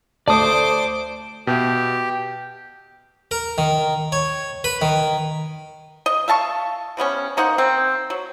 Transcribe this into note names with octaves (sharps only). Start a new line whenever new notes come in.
D2 A3 C5 D5 A5 D6 D#6
B2 G4 E5
A#4
D#3
C#5
B4
D#3
D#5
E5 F5 A5 C#6
C3 G3 B3 C#4
A#3 D#4 C5 F#5
C4
F#3